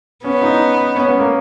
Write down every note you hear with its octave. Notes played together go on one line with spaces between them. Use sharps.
B3 C#4
D#4
C#4
B3
A#3